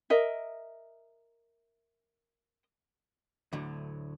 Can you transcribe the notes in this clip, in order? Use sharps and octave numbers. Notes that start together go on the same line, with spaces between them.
A#4 D#5 E5
D2 A2 D3 F#3